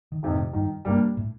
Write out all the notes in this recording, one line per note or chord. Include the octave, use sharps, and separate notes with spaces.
D#3
F2 C3 D#3
A2
G2 D#3
G2 G3 A#3 D4
A2